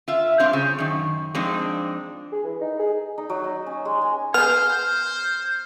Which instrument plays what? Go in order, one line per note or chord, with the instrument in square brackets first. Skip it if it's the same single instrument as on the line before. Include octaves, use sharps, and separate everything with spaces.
[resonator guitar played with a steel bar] F4 E5
G2 C4 D4 C5 F5
C#3
F#2 D#3
F2 G#3 C4 D4 D#4
[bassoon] G#4
E3
D#4
G#4
[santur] D#4
F#3
D#4
C#4
G#3
G#5
[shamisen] B3 G#4 [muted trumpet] C5 [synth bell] F6